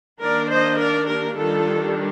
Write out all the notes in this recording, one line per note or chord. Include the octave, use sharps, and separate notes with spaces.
D#3 A#3 D4 A#4 D5
C5 D#5
A#4 D5
G4 A#4
D#3 G3 D4 F4 A4